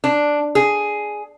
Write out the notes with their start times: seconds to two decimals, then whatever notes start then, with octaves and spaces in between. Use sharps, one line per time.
0.04 D4
0.55 G#4